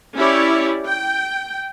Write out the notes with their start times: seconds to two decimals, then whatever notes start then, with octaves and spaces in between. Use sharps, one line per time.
0.16 C#4 E4 G4 C#5 D5
0.87 G5